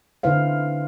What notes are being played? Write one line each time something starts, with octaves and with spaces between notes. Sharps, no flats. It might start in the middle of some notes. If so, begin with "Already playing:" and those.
D3 D#4 E4 B4 C5 F5